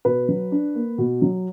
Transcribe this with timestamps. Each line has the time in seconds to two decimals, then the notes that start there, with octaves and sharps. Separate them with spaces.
0.05 B2 B4
0.28 F#3
0.52 D4
0.75 A#3
0.98 B2
1.22 F#3